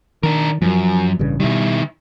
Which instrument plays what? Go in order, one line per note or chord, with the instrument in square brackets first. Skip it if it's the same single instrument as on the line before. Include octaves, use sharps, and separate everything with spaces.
[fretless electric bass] D#3 [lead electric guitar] D4 A#4
[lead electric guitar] F#2 [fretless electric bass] F3 F#3
[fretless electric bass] A1 G2 C#3
[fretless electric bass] B2 G3 [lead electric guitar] D#3 E4